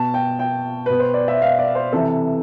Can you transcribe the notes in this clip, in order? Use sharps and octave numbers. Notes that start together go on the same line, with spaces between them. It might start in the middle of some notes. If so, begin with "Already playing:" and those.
Already playing: B2 A5
G5
G5
B2 B4
C5
D5
E5
F5
D5
C5
C3 E3 A4